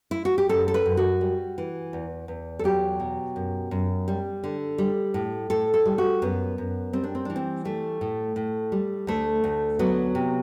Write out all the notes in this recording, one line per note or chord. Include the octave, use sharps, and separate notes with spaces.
E4
F#4
G4
F#2 A4
A4
B4
F#2
F#4
G3
E3
E2
E2
A4
F#3 G4
B2
F#2
F#2
G3
D3
G3
A2
A2 A4
A4
G3
F#4
F#2 B3
F#2
G3 C4
D4
C4
E3 D4
C4
G3 A3
A2
A2
G3
D2 A3
D2
F#3 B3
C3